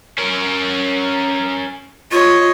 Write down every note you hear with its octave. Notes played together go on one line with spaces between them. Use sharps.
C#4 A#4
F4 C#5 D#5 C6